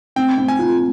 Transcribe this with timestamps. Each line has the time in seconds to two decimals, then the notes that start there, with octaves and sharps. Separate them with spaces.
0.16 C4 G5
0.38 C4
0.48 G#5
0.59 F4